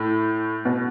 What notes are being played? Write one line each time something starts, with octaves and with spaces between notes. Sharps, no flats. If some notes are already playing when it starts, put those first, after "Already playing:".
Already playing: A2
B2